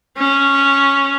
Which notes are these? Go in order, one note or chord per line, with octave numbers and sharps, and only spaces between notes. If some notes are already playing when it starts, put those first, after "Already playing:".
C#4